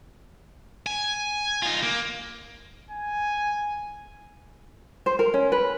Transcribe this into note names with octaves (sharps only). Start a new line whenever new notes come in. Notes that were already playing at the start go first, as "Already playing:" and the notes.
G#5
D#4 F4
A#3
G#5
C5
A#4
C#4
B4